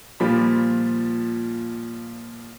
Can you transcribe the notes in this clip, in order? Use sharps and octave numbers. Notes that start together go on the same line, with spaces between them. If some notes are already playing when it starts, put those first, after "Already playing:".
A#2 F3 G3 B5